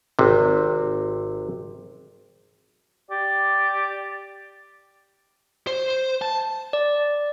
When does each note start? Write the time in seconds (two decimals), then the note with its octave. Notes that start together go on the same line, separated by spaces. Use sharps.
0.19 G#1 C3
3.11 G4 D5
5.67 C5
6.22 A5
6.73 D5